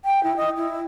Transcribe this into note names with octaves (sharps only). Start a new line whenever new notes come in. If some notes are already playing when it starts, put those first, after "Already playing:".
G5
E4
D#5
E4